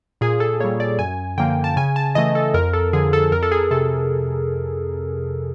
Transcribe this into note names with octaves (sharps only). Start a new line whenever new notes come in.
A#2 G#4
A4
G3 A#3 C#5
D5
F#2 G#5
D3 F3 A#3 G5
A5
C#3 G#5
A5
E3 A3 D#5
A4
F2 A#4
A4
D3 F3 G#4
A4
F2 A#4
A4
G#4
C3 A4